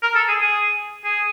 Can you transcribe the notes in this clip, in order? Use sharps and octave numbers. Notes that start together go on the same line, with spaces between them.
A#4
A4
G#4
G#4
G#4